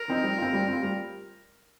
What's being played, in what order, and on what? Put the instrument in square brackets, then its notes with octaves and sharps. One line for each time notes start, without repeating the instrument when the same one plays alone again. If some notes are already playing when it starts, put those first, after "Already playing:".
Already playing: [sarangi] A#4
[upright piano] F3 C4 D#4
G3
C4 F4
G3
C4 F4
G3